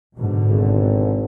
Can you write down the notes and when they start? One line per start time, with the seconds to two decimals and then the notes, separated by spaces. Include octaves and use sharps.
0.18 G#2 B2 D3
0.49 G#1